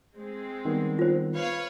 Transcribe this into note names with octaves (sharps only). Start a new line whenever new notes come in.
G#3 C4
D#3 G3 B3
F4 C5
B4 C#5 F5